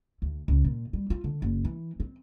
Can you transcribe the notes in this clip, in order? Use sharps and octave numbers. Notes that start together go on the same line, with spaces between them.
D2
C#2
A#2
G3
F4
D3
F#1
E3
C4